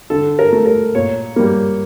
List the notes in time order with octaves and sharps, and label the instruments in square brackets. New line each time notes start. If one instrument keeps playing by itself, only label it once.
[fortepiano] D3 A4
A#4
A3
A#4
A#2 C#5
G3 A#3